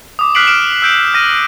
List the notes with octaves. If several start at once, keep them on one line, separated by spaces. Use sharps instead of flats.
D6 D#6
F6 F#6 B6 C7 D7 F#7
F6 D7 E7
E6 G6 D7
F6 A#6 D#7